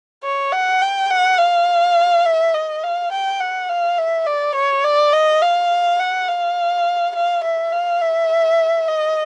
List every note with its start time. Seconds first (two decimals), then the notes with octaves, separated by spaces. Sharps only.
0.24 C#5
0.52 F#5
0.81 G5
1.10 F#5
1.39 F5
2.26 E5
2.55 D#5
2.83 F5
3.12 G5
3.40 F#5
3.69 F5
3.98 E5
4.26 D5
4.55 C#5
4.84 D5
5.13 D#5
5.42 F5
5.99 F#5
6.28 F5
7.15 F5
7.44 E5
7.73 F5
8.01 E5
8.88 D#5